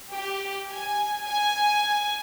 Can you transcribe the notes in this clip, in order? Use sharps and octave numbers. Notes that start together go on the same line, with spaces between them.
G4
G#5
G#5